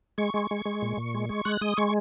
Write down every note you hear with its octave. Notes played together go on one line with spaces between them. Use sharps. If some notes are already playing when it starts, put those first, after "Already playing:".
G#3 C#6
G#3
G#3
G#3
A#2
A#2
G#3
G#3
G#3 F#6
G#3 D#6
G#3 C#6